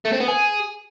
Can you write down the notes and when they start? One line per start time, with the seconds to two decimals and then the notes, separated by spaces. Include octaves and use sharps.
0.05 A3
0.13 C4
0.20 B3
0.28 G#4